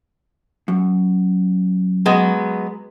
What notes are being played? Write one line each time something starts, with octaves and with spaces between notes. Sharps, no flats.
F#2
F#3 G#3 B3